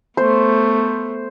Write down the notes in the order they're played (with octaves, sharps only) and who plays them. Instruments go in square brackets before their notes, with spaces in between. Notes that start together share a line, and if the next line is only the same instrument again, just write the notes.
[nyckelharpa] A3 B3 [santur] C5